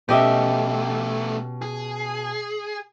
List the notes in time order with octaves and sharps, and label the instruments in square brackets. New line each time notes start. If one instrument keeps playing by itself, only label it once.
[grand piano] B2 C#4 [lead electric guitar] A3 B3 [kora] G4 D#5 E5
[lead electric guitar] G#4